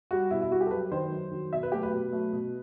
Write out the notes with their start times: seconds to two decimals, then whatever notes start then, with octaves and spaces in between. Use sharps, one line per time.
0.11 G3 F#4
0.31 B2 E4
0.42 E4
0.51 G3 F#4
0.61 G4
0.66 A4
0.71 F#2 B4
0.92 D#3 F#3 C5
1.12 F#2
1.31 D#3 F#3
1.53 B2 E5
1.63 B4
1.72 F#3 A3 G4
1.83 B4
1.92 B2
2.13 F#3 A3
2.32 B2